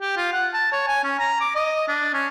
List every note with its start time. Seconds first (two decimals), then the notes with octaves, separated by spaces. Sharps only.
0.01 G4
0.17 F4
0.33 F#5
0.54 A5
0.72 C#5
0.88 G#5
1.04 C#4
1.19 A#5
1.41 D6
1.55 D#5
1.88 D4
2.14 C#4